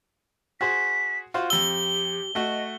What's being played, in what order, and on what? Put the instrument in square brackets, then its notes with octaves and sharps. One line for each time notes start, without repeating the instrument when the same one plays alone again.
[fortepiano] F#4 G#4 C5 [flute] B6
[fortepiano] F4 F#4 C5
[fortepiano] F2 E6 [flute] G4 [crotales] G7
[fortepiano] A3 F#4 [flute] D#5